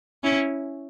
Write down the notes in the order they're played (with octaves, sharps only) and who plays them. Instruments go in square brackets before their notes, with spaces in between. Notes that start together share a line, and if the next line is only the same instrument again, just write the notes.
[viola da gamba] C#4 E4